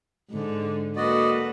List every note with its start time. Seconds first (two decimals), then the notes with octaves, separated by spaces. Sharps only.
0.30 G#2 D3
0.96 A#3 F#4 A4 B4 D5 D#5